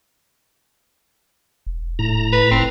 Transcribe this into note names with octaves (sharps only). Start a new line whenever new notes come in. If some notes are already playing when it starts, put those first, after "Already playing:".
E1
A2 A#5
B4
F1 C4